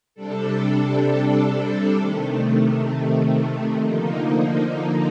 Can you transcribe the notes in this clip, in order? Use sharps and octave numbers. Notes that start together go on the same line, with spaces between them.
C3 G3 D4 A4
C3 D#3 A3
D3 F3 A#3 D#4